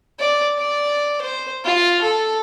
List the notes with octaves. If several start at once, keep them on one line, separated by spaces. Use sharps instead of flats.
D5
D5
C5
F4
A4